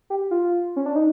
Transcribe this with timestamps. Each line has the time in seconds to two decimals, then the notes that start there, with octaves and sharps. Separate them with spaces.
0.10 G4
0.31 F4
0.76 C#4
0.86 D4
0.96 D#4